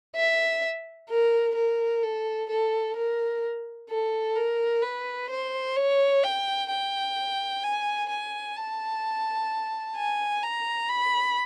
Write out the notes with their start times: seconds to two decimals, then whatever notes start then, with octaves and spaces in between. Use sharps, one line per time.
0.16 E5
1.09 A#4
1.55 A#4
2.03 A4
2.49 A4
2.96 A#4
3.89 A4
4.36 A#4
4.82 B4
5.30 C5
5.76 C#5
6.23 G5
6.70 G5
7.63 G#5
8.09 G#5
8.56 A5
9.96 G#5
10.43 A#5
10.89 B5